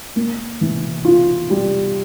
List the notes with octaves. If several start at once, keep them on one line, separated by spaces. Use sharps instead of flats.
A#3
E3
F4
G3